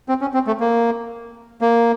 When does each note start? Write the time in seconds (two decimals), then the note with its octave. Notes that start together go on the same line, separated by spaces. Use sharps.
0.09 C4
0.21 C#4
0.34 C4
0.47 A3
0.60 A#3
1.61 A#3